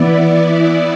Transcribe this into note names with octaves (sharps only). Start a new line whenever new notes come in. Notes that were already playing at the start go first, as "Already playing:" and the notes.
Already playing: E3 B3 E4 D5